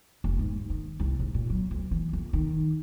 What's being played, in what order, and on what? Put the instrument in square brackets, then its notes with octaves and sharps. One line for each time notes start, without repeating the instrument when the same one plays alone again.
[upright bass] F1
G#2
D#3
C2
G#2
A#2
F#3
D2
E3
F2
D#3